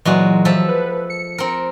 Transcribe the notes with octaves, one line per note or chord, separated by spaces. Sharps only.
A#2 E3 F#3 G#3 F#4
F3 A4 E5
B4
C#7
C4 A#4